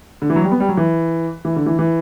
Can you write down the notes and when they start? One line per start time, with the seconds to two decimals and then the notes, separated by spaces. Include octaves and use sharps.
0.22 D3
0.30 E3
0.36 F#3
0.44 G3
0.51 B3
0.60 G3
0.69 F#3
0.77 E3
1.45 E3
1.56 D3
1.66 E3
1.79 E3